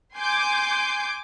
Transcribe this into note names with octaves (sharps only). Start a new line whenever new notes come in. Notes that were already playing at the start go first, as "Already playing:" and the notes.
G#5 C6 D6 G6